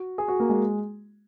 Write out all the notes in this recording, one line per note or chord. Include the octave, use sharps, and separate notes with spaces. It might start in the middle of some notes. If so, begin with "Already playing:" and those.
Already playing: F#4
G#4
F#4
A#3
G#3